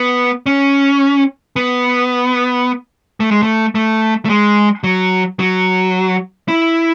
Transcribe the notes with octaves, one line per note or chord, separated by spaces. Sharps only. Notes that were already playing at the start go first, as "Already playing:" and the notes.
Already playing: B3
C#4
B3
A3
G#3
A3
A3
A3
G#3
F#3
F#3
E4